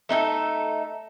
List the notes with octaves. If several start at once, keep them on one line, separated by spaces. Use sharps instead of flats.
A3 D#4 G4 A4